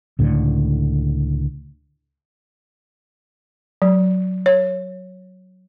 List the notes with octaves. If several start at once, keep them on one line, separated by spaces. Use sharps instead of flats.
C#2 A2 D3
F#3
C#5